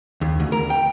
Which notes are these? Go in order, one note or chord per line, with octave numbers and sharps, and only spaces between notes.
D#2
D2
A#4
G5